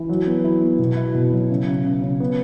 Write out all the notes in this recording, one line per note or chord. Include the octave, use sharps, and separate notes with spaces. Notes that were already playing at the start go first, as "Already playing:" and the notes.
Already playing: E3
F#3
B3
E4
B3
B2
E4
B2
F#3
C#3
C#3
C#3
C#3
B3